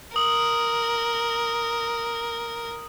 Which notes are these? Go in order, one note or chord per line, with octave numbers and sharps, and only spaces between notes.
A#4 D#6 F#7